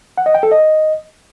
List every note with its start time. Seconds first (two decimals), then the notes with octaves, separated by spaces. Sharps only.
0.18 F#5
0.26 D#5
0.35 G5
0.43 A4
0.51 D#5